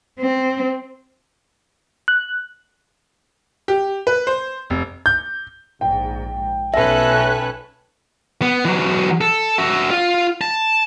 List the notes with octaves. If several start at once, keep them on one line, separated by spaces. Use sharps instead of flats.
C4
F#6
G4
B4
C5
F1
G6
A#1 G#2 G5
B1 C#4 A4 B4 E5 F#6
B3
E3 F#3
A4
F#4 E5
F4
A5